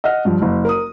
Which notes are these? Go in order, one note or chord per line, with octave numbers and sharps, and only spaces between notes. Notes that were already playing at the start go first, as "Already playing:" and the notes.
D#5 F#5 F6
G2 F3
F#1
A#4 D#6